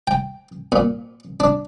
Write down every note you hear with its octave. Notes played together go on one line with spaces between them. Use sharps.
G5
A#2
D4